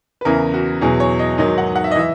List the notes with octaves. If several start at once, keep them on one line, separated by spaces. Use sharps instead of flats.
B4
E2 C#3 E3 A#4
F#4
E2 B2 F#3 G#4
C#5
D#5
G#2 D#3 F#3 D#5
F#5
F#5
E5
D#5
E3 E5